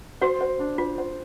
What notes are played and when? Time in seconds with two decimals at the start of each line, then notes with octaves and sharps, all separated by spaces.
0.21 F#4 C5
0.41 C5
0.59 D4
0.78 F4 C5
0.98 C5